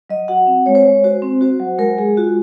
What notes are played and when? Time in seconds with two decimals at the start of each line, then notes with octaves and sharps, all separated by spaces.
0.10 F#3 D#5
0.28 F#4 F#5
0.47 C4
0.66 G#3 C#5
0.75 C5
0.83 G#3 C#5
1.04 F#4 C5
1.22 C4
1.41 F#4 C5
1.60 F#3
1.78 G#3 A#4
1.98 G#3 G#4
2.17 F4 F#4